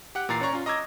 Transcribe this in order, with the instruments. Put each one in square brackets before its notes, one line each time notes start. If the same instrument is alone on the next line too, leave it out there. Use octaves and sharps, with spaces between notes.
[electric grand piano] G4 F#5 F#6
A#2 E3 A#5 A6 C7
C#4 C#5 D5 A#5 C#6
C#4 F4
D#5 A#5 D6 E6 G#6 A#6